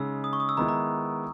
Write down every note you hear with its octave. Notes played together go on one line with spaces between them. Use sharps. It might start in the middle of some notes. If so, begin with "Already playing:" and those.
Already playing: C#3 G#3 D#4 E6
D#6
C#6
D#6
E6
D#3 G#3 B3 E4 A#5
A#5